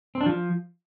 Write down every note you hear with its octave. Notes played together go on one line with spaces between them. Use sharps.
C4
D4
F3